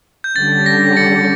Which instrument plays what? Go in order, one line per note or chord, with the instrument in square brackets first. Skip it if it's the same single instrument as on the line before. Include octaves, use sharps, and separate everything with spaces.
[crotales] G6
[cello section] D3 G3 C#4 G4 [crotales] A6
[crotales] A#6
A6 C#7